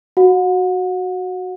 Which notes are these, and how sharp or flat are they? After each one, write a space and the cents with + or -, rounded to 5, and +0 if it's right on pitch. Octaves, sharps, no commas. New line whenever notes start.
F#4 +0 F#5 -35